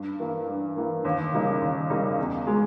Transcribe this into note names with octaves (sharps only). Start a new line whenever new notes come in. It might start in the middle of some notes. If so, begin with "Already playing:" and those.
Already playing: G2
E3 A#3
G2
E3 A#3
D#2
C#3 G3 A#3 D#4
D#2
C#3 G3 A#3 D#4
E2
G#3